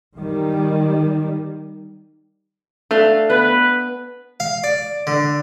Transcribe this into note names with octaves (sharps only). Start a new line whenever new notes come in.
D#3 G3
A3 D4 F5 C6
B3 B4
F5
D5
D3